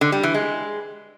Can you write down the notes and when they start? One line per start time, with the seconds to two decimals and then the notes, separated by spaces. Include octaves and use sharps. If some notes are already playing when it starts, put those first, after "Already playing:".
0.01 D3
0.12 G3
0.23 E3
0.34 G#3